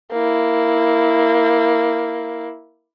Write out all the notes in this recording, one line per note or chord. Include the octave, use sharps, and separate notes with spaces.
A#3 E4